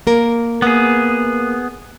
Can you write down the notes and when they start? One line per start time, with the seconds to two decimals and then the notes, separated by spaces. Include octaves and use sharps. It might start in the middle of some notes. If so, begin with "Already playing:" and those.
0.07 A#3 A#4
0.62 A#3 B3 G#4